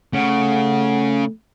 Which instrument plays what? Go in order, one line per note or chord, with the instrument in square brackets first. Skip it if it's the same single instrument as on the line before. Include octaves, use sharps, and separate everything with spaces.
[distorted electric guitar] C#3 [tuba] A3 [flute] F#5